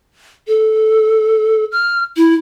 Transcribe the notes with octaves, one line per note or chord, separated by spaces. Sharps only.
A4
F6
E4